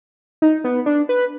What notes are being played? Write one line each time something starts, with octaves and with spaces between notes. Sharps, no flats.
D#4
B3
D4
B4